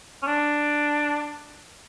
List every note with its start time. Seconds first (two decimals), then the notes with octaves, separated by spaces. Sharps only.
0.23 C#4
0.27 D4